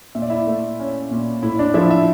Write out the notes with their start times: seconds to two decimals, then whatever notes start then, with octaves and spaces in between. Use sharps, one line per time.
0.15 A#2 E5
0.22 D5
0.30 E4 E5
0.47 A3
0.79 C#4
1.11 A#2
1.42 A2 E4 E5
1.59 D4 D5
1.74 F3 E4 E5
1.90 E4 E5